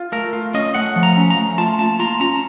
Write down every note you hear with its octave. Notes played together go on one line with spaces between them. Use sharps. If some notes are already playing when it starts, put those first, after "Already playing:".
Already playing: F4
A3 A#4
F4
C#4 D#5
A3 F#5
F3
A#5
C#4
A#5
A3
F4 A5
A#3 A5
F4 A#5
C#4 A#5